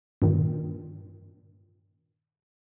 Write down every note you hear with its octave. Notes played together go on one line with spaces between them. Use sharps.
G2 A#2 D#3